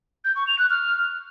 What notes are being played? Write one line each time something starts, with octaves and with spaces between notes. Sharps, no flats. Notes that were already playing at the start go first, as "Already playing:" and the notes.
G6
C#6
F7
F#6
F6